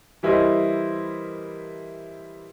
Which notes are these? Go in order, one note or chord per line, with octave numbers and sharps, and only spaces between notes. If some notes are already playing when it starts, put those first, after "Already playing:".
E3 G3 E4 A#4 C5 D#5